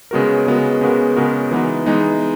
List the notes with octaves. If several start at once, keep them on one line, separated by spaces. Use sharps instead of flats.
C#3 G#3 B3 F#4 A#4
C#3 G#3 B3 F#4 A#4
C#3 G#3 B3 F#4 A#4
C#3 G#3 B3 F#4 A#4
E3 G#3 B3 D#4
E3 G#3 B3 D#4